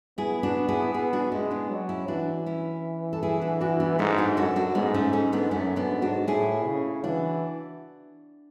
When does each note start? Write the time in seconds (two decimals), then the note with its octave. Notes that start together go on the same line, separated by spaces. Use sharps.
0.18 B3 E4 G#4
0.43 D4 F#4
0.69 E4 G#4
0.94 B3 E4 G#4
1.13 D4 F#4
1.32 G#3 C#4 E4
1.51 B3 D4
1.70 F#3
1.89 C#4 E4
2.08 E3 D4 F#4
2.46 C#4 E4
3.13 A4
3.23 E4 G#4
3.41 D4 F#4
3.61 D4 F#4
3.80 B3 D4
3.99 G#2 A3 C#4
4.18 D4 F#4
4.37 F#2 F#4 A4
4.56 D4 F#4
4.75 G#2 G#3 B3
4.94 A3 C#4
5.13 A3 C#4
5.33 B3 D4
5.51 F#2 A3 C#4
5.76 B3 D4
5.89 G#2
6.02 D4 F#4
6.27 A2 E4 G#4
6.66 C#3
7.04 E3 D4 F#4